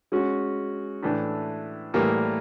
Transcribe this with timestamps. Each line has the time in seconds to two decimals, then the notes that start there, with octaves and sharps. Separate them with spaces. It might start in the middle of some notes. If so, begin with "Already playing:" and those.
0.12 G#3 C#4 F#4
1.03 A2 E3 A3 D4
1.94 A2 E3 G3 A#3